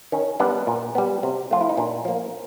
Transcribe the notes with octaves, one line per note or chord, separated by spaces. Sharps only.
D#3 C#4
G3 B3 D4
A#2
G3 B3
C3
F3 A3 F4
E4
D#4
A#2 D4
F3 A#3